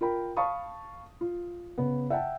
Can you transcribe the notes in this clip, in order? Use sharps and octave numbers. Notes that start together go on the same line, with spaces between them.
F4 A#4 G5 B5
F5 A5 B5 C#6 D#6
F4
C#3 B3
E5 F#5 G5 A5